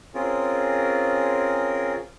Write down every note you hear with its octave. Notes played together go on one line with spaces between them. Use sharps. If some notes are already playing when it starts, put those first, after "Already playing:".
C4 C#4 F4 G#4 A#4